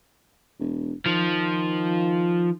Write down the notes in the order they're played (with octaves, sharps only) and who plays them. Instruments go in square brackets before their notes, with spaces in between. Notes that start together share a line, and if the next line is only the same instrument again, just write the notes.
[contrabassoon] E1
[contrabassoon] D#3 [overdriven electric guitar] F3